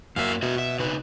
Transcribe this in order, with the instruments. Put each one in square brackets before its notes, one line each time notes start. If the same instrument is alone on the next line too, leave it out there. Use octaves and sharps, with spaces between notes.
[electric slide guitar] F#2 F#3 A#3 [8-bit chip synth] E5 F5
[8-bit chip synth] B2 [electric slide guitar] F#4 E5
[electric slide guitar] E5
C#3 D#4 B4